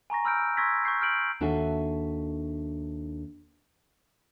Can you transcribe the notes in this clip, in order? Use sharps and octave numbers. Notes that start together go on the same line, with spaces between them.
G#5 A#5 C#6 A#6
B5 E6 F6 G6 D7
C6 C#6 E6 G#6 A#6 B6
C#6 G6 C7
F6 G6 D7 F#7
D#2 D4 F#4 A4 E5 G#5